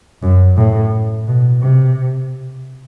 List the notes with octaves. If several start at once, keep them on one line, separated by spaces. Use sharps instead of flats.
F#2
A2
B2
C3